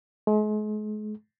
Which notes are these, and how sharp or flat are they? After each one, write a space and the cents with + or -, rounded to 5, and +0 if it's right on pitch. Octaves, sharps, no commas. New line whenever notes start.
G#3 +40